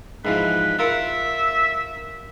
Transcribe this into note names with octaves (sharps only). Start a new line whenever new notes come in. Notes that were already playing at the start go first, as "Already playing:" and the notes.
G#2 E3 F3 B4
F4 A#4 E5 F#5